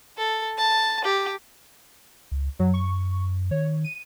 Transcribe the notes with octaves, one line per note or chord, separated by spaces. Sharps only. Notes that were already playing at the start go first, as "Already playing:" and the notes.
A4
A5
G4
C#2
F#2 F#3
C#6
D#3 C#5
D#7